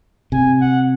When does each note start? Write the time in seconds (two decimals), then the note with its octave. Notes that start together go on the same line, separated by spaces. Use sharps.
0.32 C3 G#5
0.61 F#5